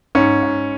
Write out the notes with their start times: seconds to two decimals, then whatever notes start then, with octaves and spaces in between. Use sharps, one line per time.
0.15 G#2 C#4
0.43 G#2